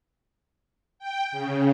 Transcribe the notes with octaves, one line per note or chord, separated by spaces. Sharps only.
G5
C#3